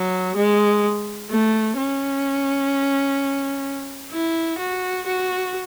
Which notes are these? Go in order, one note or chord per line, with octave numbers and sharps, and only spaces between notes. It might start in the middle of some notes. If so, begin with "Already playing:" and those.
Already playing: F#3
G#3
A3
C#4
E4
F#4
F#4